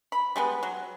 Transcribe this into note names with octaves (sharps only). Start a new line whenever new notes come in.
B5
G3 G#3 B3
F#3